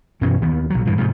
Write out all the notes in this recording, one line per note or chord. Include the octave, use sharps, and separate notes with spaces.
F#2 B2 E3 C#4
D#2 D#3 B3
A#1 F#3
G2 A#2 E3
G#2 C3 F3